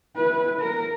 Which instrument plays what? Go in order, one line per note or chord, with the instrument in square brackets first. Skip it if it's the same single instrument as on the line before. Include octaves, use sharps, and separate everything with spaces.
[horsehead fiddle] E4 B4
A#4